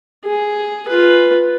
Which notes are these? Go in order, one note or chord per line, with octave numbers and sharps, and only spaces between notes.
G#4
F4 B4